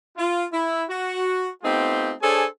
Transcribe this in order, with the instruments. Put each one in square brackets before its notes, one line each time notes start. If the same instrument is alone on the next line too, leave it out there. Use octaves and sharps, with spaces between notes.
[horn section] F4
E4
F#4
A3 B3 C4 D#4 F4 G4
D4 G#4 A4 C5 C#5 G#5